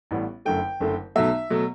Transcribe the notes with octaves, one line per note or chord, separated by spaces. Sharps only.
A1 A2 G3 B3
F#1 F#2 D3 A3 G5
F#1 F#2 D3 A3
B1 B2 F#3 A3 E5
B2 F#3 A3